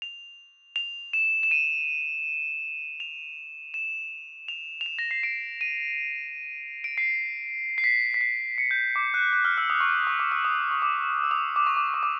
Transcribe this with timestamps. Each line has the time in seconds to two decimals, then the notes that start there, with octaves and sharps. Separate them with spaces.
0.02 F7
0.76 F7
1.13 E7
1.43 E7
1.51 D#7
3.00 F7
3.74 E7
4.48 F7
4.81 F7
4.86 E7
4.99 A#6
5.11 C7
5.23 D7
5.61 D#7
6.84 D7
6.98 C7
7.78 C7
7.84 B6
8.14 B6
8.21 C7
8.58 C#7
8.71 G6
8.96 D6
9.14 F#6
9.33 F#6
9.45 F6
9.57 E6
9.70 D#6
9.81 C#6
9.88 D6
10.07 C#6
10.19 D6
10.32 E6
10.45 D#6
10.71 C#6
10.82 D6
11.24 E6
11.31 D#6
11.56 D6
11.67 C#6
11.77 D6
11.94 C#6
12.03 D6